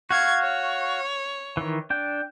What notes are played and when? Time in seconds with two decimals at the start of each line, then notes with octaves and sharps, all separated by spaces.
0.11 F#4 F5 C#6 G#6
0.42 C#5
1.57 D#3 E3
1.90 D4 G5